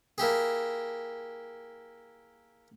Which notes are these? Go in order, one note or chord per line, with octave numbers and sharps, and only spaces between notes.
A#3 E4 G4 G#4